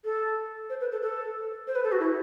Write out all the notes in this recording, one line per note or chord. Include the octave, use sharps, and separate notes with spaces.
A4
C5
B4
A4
A4
C5
B4
A4
F#4
E4